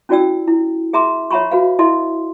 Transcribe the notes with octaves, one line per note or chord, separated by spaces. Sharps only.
C#4 E4 F#4 D5 G5 E6
E4
G#4 E5 A#5 C6 D6
C#5 E5 F#5 A#5 B5 C#6
F#4 B4 F5
E4 A4 D#5 E5 C6